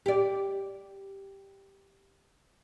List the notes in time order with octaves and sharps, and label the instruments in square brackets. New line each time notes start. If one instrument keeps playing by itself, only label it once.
[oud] G4 D5